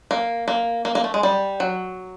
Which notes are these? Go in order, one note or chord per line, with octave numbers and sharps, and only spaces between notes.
A#3
A#3
A#3
A#3
A3
G#3
G3
F#3